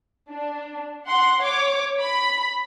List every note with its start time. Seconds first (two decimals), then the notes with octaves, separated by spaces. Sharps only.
0.30 D4
1.07 F#5 C6
1.42 C#5 D6
2.01 B5